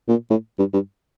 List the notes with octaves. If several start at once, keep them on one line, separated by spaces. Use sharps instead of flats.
A#2
A2
G2
G2